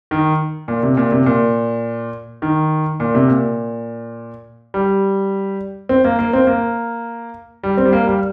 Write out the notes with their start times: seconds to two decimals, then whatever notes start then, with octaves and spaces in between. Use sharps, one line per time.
0.11 D#3
0.68 A#2
0.83 C3
0.97 A#2
1.12 C3
1.26 A#2
2.42 D#3
3.00 A#2
3.15 C3
3.28 A#2
4.74 G3
5.89 C4
6.05 A#3
6.19 A#3
6.33 C4
6.47 A#3
7.63 G3
7.77 C4
7.85 G3
7.93 A#3
8.07 G3